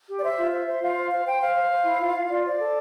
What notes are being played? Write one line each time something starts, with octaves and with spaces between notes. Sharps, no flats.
G4
D5
C5 E5
F4
C5 E5
C5
F4 F5
C5
C5 F5
C5 G5
C5 F5
C5
C5
E4
F4
F4
F4 D5
C5 D5
A4